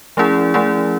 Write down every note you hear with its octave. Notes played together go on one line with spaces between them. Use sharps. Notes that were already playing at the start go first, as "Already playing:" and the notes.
F3 A3 C#4 E4 G#4
F3 A3 C#4 E4 G#4